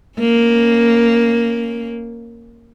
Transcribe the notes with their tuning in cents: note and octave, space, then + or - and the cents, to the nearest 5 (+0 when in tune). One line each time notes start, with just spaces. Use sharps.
A#3 +0 C#4 +0